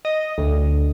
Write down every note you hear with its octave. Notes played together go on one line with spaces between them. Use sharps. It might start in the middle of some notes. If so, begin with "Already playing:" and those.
D#5
D2